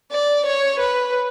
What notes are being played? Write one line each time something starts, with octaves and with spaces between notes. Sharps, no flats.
D5
C#5
B4